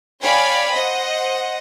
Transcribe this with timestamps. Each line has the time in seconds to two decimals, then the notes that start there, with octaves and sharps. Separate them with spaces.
0.22 C#5 D5 F5 G5 G#5 B5
0.74 C5 D#5 F#5